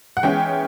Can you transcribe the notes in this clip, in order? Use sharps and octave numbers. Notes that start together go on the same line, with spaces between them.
F#5
E3 G#3 C#4 G5